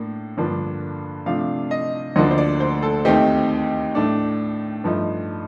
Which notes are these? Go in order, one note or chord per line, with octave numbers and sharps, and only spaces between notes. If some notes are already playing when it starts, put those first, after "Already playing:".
Already playing: A2 A#3 D4
G2 D3 F3 A#3 D4
C3 F3 A3 D4 F5
D#5
D2 D3 F3 A#3 D4 D#5
C5
D5
C5
A4
D#2 D#3 A3 C4 D#4 G4
A2 A3 D4
G2 F3 A3 D#4